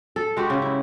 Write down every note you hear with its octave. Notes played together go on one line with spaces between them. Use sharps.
A4
G#3 F#4 G4
C#3
E4